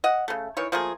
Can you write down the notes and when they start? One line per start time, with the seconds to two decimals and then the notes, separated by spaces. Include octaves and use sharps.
0.04 D#5 F#5
0.28 C#3 A3
0.57 D#3 E3 C#5
0.72 F3 A3 A#3 G#4